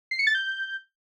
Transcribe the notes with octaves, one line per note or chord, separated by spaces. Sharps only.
C7
C#7
A6
G6